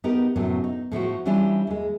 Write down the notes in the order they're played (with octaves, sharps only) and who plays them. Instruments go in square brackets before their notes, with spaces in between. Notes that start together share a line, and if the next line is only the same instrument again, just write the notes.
[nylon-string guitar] B3 D#4 G4 A#4
F#2 A2 C3 F#3 B3
D#4
A2 F3 A3 F#4
E3 G3 C#4 D4 E4 F4
D#2 G#3